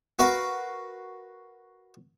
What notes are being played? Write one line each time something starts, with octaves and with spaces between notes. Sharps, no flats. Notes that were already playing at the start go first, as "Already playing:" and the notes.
F#4 A#4 B4 F5